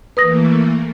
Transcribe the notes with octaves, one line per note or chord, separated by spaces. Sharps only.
E3 A3 A#3 B4 D#6 A#6